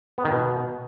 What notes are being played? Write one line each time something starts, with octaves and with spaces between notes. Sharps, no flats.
B3
D#3
B2